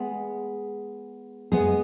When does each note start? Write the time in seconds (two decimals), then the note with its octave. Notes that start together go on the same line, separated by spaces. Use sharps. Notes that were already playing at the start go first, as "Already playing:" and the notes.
Already playing: G#3 B3 G#4
1.52 G#3 B3 G#4